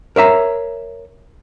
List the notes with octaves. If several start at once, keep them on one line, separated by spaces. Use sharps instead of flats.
A#4 C#5 E5 A#5